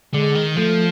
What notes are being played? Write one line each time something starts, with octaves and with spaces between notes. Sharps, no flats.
D3 G#3
D#3
F3 A3